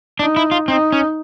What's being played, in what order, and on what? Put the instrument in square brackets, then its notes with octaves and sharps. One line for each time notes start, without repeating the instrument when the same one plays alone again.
[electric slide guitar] D4 [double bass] D#4
[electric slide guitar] E4
F4
[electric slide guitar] C4 [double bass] D#4
[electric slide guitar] C#4